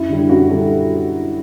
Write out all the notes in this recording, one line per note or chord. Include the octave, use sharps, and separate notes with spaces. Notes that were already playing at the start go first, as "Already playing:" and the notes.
Already playing: F#2 E4
D3 G3
F#2 F#4
D3 G3 A4